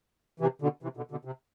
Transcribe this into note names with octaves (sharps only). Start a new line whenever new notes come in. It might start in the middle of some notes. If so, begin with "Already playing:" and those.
C3 E3
B2 D3
C3 E3
B2 D3
B2 D3
C3